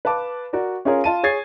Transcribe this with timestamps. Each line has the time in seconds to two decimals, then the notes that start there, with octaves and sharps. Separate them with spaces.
0.05 B4 F5 A5 D6
0.53 F#4 A#4 D5
0.85 C#4 F4 G#4 A#4 C#5
1.04 F4 A5 D#7
1.23 G#4 C#5 G#6 A6 C7